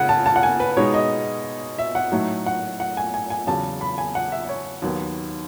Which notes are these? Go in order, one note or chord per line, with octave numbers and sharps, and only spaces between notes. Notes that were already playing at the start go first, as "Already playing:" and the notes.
Already playing: C#3 G#3 F#5
A5
A5
F#5
G#5
B4
B2 G#3 B3 D#4 C#5
D#5
E5
F#5
A2 F#3 A3 D#4
F#5
F#5
G#5
G#5
G#5
E2 C#3 F#3 A5
B5
G#5
F#5
E5
C#5
D#2 D#3 F#3 B3